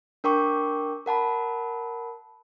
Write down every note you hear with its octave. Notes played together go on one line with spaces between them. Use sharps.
D4 A#4 G5 C#6 D6
A#4 F#5 A5 B5